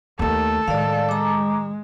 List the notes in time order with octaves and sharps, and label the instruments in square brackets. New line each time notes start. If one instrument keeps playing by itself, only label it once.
[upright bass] D#2 A3 [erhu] A4
[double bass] A2 G#3 [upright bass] D#3 [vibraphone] D5 F5
[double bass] G#3 [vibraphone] A#5 D6